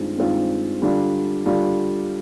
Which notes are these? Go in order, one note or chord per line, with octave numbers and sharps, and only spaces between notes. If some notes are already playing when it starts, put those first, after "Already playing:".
Already playing: G2 D#3 G#3 C4 F4
G2 D#3 G#3 C4 F4
D3 G3 D4 F4
D3 G3 D4 F4